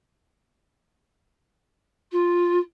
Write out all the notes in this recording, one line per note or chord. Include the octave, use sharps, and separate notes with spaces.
F4